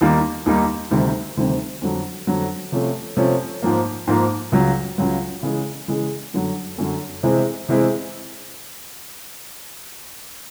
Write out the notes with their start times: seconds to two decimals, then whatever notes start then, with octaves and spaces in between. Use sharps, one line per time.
0.01 D#2 D#3 G3 A#3 D#4
0.46 D#2 D#3 G3 A#3 D#4
0.91 D2 C3 D#3 G3 C4
1.37 D2 C3 D#3 G3 C4
1.82 F2 D3 F#3
2.27 F2 D3 F#3
2.72 C3 F3 A3 C#4
3.17 C3 F3 A3 C#4
3.62 G#2 F3 A#3
4.07 G#2 F3 A#3
4.52 C#2 C#3 F#3
4.98 C#2 C#3 F#3
5.43 C#3 E3 G#3
5.88 C#3 E3 G#3
6.34 F#2 D3 F#3
6.78 F#2 D3 F#3
7.23 C3 E3 G#3 C4 E4
7.69 C3 E3 G#3 C4 E4